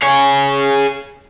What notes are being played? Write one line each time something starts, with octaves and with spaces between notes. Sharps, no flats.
G#4 C#5